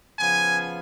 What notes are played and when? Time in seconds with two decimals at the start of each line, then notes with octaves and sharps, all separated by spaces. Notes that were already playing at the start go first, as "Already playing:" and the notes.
0.19 C#3 F3 B3 F4 G#5